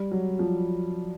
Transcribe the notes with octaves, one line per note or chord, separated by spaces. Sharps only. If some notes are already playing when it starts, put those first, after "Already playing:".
Already playing: G3
F#3
F3